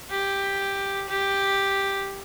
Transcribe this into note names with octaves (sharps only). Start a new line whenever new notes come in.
G4
G4